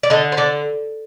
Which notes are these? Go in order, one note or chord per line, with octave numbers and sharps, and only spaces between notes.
D5
D3 D#5
C5
D3 D5